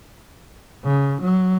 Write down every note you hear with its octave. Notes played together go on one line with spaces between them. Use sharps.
C#3
F#3